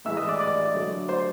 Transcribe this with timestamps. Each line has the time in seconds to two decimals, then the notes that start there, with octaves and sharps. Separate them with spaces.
0.05 A2 E3 G#3 E5 E6
0.17 D#5 D#6
0.28 D5 D6
0.39 D5 D6
0.74 D3 F#3 A3
1.08 C5 C6